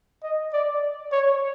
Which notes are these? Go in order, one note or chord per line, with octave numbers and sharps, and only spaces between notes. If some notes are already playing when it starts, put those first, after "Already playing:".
D#5
D5
C#5